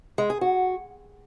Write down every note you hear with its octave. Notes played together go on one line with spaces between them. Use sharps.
G#3
G#4
F#4